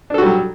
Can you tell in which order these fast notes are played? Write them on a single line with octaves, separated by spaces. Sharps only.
D4 A4 F#4 G3 F#3